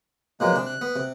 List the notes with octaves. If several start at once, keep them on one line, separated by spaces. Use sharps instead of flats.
B2 F3 F#3 G#3 A#3 F#6
C3 D4
F#6
B3
C3